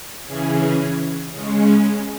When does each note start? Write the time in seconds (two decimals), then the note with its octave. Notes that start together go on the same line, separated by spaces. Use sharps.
0.25 C#3 E3 C#4 G#4
1.32 C#3 G#3 C#4